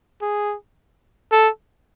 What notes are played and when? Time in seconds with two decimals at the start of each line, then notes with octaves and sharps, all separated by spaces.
0.22 G#4
1.32 A4